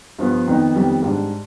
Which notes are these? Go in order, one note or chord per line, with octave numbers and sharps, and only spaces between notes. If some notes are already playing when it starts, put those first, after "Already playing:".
G2 F3 B3
F2 D#3 B3 D#4
F2 D#3 G3 B3
G#2 G3 D4